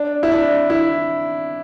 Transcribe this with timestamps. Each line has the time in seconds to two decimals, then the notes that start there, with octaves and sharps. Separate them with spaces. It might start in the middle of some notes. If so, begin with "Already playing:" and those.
Already playing: D4
0.23 E4
0.32 D4
0.70 E4